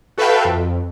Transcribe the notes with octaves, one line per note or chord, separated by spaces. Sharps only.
F#4 A4 B4 E5 F5 G5
F2